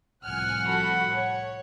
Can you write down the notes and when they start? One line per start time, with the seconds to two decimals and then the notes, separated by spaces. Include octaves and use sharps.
0.24 C2 A2 F3 F#5 G#5 F6 F#6
0.67 F#4 A4 B5
1.13 C#5